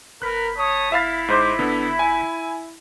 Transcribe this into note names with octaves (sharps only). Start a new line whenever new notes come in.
G1 A#4 B4 F#6 B6
C#5 A5 D#6
E4 E5 F5 A6
G#2 C5 D6
D3 B3
G#5